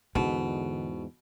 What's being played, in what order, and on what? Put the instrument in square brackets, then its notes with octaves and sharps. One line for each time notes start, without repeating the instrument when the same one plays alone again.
[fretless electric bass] E2 G#2 [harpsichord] B2 [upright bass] D3